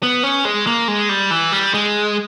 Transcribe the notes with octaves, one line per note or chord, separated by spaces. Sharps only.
B3
C#4
G#3
A#3
G#3
G3
E3
G3
G#3